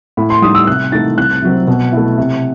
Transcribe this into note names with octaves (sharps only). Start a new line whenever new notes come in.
A2 B5
C6
G3 D#4 D#6
E6
C3 F#6
E3 A3 D#4 A6
C2 F#6
C3 F#3 C4
B2
A3 E4
C3